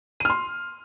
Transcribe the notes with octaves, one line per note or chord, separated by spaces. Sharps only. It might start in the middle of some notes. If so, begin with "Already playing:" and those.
C6 F6 D#7